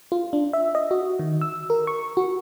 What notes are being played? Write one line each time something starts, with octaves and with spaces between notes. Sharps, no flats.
F4
D4
E5
D#5
F#4
D#3
E6
A#4
C#6
F#4